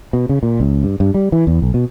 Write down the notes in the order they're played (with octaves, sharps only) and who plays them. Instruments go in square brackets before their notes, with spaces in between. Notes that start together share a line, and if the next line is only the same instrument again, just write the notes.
[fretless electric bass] B2
C#3
A#2
C#2
G2
G2
G3
E3
E2
B1
B2